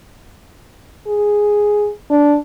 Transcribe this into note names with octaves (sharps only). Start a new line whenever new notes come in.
G#4
D4